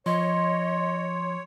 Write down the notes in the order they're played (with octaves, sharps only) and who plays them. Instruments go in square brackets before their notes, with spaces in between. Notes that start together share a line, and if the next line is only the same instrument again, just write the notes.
[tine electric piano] F3 [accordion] C#5 [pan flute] D#5 [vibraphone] C6